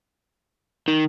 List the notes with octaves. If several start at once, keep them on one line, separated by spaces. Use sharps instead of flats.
D#3